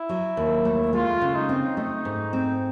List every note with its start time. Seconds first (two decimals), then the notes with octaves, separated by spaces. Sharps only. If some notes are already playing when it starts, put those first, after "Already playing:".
Already playing: E4
0.09 F#3
0.37 D#2
0.65 A3
0.93 G#3 F4
1.21 C#3
1.35 D#4
1.49 C4
1.77 A3 D#4
2.05 G#2
2.33 C4